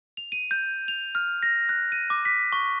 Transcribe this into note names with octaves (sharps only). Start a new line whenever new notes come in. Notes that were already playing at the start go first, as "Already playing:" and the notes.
F7
D#7
G6
F7
F6
A#6
F#6
D#7
D6
B6
C#6